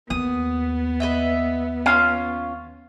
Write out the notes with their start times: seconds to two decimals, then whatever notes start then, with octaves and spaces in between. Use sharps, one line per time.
0.10 D#2 B3 D#6
1.00 B4 D#5 E5
1.86 C#4 F4 F5